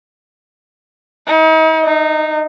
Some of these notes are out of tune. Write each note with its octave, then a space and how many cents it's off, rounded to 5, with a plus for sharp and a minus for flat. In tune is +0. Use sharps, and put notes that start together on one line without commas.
D#4 +40
D#4 -20